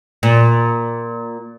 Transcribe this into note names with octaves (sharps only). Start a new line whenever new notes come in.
A#2